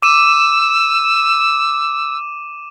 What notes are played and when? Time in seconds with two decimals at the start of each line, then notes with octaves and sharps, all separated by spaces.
0.02 D6 E6 D#7 E7